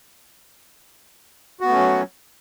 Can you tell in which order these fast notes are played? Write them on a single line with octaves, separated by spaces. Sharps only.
F#4 B3 A3 C#4 F#3